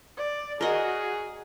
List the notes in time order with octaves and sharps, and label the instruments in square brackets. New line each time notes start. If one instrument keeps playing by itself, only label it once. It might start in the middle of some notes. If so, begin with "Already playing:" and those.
[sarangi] D5
[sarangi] F#4 [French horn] G#4 [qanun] A#4 D#5